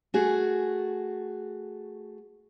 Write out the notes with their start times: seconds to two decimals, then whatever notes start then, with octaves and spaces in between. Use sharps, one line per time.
0.14 A3 F#4 G#4